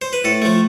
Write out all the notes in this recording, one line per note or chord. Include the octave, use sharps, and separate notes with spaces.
C5
B4
A2 A4
F3 A3